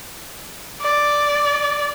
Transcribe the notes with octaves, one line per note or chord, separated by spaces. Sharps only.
D5